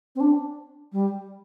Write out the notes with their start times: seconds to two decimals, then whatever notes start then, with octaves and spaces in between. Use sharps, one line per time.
0.15 C4
0.20 D4
0.92 G3